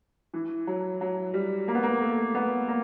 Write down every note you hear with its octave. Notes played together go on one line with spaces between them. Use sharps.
E3
F#3
F#3
G3
A#3
B3
A#3
A3
B3
A#3